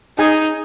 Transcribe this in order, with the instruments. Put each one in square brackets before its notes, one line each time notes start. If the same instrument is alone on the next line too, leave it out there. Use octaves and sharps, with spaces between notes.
[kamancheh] D#4 [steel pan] G#4 G#5